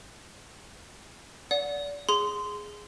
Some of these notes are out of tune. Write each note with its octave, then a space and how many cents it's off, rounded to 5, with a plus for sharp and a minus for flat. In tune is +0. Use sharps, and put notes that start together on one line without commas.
D5 -30 F#5 -25
G#4 +0 C6 -15